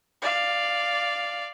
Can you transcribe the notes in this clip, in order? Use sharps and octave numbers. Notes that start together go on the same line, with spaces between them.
D5 F5